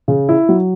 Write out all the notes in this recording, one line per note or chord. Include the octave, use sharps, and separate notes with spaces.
C#3
E4
F#3